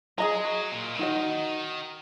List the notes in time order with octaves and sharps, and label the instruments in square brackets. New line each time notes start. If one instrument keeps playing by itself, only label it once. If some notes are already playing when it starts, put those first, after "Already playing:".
[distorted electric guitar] G#3 [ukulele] G#4 D#5 A#5
[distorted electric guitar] F#3
A#2
C#3
[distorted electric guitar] D#3 [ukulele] D#4 F#4 D#5